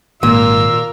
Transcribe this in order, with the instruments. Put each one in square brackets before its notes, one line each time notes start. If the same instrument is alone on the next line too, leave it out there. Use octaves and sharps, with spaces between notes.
[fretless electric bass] G#1 [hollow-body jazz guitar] A#2 [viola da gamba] F4 A#4 [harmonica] E6